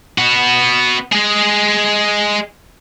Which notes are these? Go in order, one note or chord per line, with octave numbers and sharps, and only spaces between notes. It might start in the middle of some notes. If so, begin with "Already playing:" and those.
B3 F#4
G#3 G#4